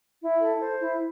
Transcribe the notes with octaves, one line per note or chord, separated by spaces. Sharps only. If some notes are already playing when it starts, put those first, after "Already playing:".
E4
A4
C5
E4